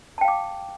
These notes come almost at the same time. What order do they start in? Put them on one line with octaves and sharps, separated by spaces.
A5 G5 F5 D6